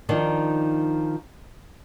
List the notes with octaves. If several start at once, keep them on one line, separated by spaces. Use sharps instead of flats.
D#3 F3 D4 D#4